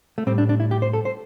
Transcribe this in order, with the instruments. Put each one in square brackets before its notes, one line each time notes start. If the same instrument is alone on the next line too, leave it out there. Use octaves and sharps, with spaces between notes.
[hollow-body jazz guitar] A3
A2 G3 C4
D4
D4
E4
G4
C5
A4
C5